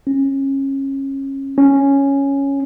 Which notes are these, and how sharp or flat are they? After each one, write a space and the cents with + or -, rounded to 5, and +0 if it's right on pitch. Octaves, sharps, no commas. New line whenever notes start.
C#4 -25
C#4 +0